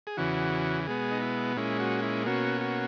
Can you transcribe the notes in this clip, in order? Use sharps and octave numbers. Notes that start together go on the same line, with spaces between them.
G#4
E2 C#3 E3 F#4
B2 G#3 B3 G#4
D#4
E4
A#2 G#3 C#4 E4
F#4
E4
B2 A#3 C#4 F#4
F#4